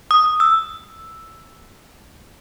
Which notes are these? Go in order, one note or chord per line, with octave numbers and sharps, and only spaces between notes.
D#6
E6